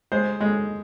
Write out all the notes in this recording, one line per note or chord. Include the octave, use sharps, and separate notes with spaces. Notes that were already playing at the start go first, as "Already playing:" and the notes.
G#3 C5
G#3